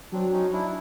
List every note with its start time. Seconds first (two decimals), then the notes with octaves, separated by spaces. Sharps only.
0.12 F#3 C4 D4
0.32 C#4 D#4
0.52 D4 E4